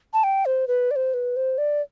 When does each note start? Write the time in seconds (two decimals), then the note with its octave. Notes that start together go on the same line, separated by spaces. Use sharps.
0.13 A5
0.24 G5
0.46 C5
0.68 B4
0.91 D5
0.96 C5
1.14 B4
1.36 C5
1.58 D5